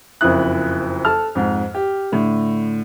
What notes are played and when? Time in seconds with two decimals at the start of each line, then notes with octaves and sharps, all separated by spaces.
0.21 F#1 F2 F3 E4 D#6 F#6
1.05 A4 A5 F6
1.35 F2 G#2
1.75 G4
2.12 A2 D3